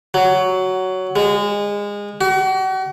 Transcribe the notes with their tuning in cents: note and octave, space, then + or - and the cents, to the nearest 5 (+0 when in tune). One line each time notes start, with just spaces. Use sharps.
F#3 +10
G#3 -25
F#4 +40